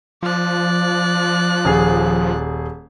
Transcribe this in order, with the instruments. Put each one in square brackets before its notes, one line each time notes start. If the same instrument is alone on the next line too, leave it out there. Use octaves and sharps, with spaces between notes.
[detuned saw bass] F3 [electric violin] D5 F#6
[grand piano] D#1 G#4